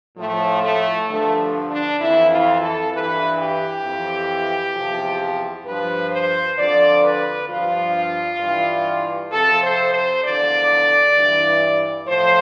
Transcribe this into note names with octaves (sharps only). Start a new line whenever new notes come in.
A2 F3 A3
A3
G2 D3 F3 A3
D4
F2 E3 E4
F4
A4
G2 E3 B4
G4
F2 E3
E2 C3 F3
G2 F3 B4
C5
F2 D3 F3 D5
B4
G2 F3 F4
G2 E3
F2 C3 F3 A4
C5
C5
E2 D3 F3 D5
G2 E3
A2 F3 C5